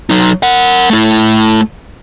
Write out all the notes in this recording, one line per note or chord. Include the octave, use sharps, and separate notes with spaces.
F#3 D#4
A#4 F#5
A3 E4